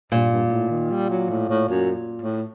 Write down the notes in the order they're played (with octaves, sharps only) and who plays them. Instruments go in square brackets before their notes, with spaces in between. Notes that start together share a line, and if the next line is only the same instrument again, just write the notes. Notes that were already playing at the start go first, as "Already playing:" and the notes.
[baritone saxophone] G2 [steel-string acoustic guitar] A#2
[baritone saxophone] G2
G2
A2
D#3
G3
F#3
A2
A2
F#2
A2